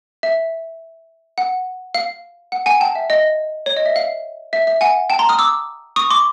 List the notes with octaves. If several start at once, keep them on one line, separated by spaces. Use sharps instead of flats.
E5
F#5
F5
F#5
F#5 G#5
G5 A5
E5
D#5
C#5
D#5
E5
F5
E5
E5
F#5 G#5
G5 A5
A#5 C6
D#6 F6
D6 E6
C#6 D#6
C6 D6